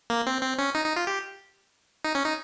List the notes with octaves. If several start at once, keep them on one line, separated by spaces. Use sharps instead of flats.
A#3
C4
C4
C#4
D#4
D#4
F4
G4
D#4
C#4
D#4